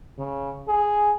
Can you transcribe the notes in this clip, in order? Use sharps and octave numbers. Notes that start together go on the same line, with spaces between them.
C#3
G#4